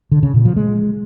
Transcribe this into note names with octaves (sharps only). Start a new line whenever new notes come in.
D3
C#3
A#2
F3
G#3